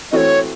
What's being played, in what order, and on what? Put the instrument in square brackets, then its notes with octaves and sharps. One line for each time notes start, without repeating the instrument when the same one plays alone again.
[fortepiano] E3 A3 C4 F#4 [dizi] C#5 D#5